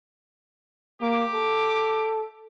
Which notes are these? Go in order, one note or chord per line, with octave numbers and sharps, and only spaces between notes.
A#3 G4 D6
A4